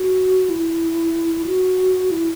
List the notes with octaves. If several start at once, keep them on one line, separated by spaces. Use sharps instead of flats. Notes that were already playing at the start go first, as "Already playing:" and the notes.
Already playing: F#4
E4
F#4
E4